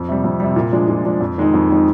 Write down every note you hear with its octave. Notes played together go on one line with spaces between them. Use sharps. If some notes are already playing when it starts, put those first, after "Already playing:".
Already playing: F2
C3 G3
F2
C3 G3
A#2
F3 G#3 D4
A#2
F3 G#3 D4
F2
D#3 G#3 D#4
F2
D#3 G#3 D#4